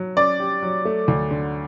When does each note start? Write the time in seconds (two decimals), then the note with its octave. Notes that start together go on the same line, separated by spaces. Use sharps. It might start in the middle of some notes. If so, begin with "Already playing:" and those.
Already playing: F#3
0.17 C#4 D5
0.40 G4
0.63 F#3
0.85 A3
1.08 D2
1.31 D3